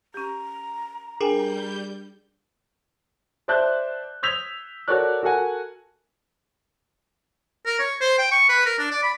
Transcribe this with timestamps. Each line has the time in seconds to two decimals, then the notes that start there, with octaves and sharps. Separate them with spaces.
0.14 C#4 G4 A#5
1.21 G3 D4 G#4 A#4 G5 G#5 G6
3.48 C5 D5 E5 A5 F#6 G6
4.23 D#6 E6 G6 G#6 B6 F7
4.88 F#4 A4 A#4 C#5 D5 F#6
5.23 F#4 A4 A#4 F#5 G#5
7.66 A#4
7.79 C#5
8.01 C5
8.19 G5
8.31 C#6
8.49 B4
8.66 A#4
8.79 D4
8.91 D5
9.03 B5